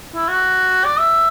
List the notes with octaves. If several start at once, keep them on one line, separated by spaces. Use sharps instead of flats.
E4
F#4
D5
E5